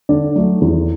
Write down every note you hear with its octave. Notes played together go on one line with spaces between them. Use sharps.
D3 D5
F#3 A3
E2